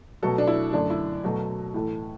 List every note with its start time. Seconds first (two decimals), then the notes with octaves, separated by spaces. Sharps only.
0.22 B2 F#3 A3 A4
0.38 D4
0.47 E4
0.73 F#2 D3 A3 D4
0.90 E4
1.24 B2 F#3 A3
1.74 A2 E3 A3